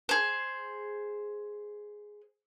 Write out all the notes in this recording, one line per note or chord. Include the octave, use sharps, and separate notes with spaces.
G#4 C5